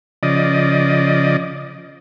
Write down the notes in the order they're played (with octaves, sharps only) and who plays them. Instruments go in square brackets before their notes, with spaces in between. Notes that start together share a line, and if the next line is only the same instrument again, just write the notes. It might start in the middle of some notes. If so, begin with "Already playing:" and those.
[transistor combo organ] C#3 F3 D5 D#5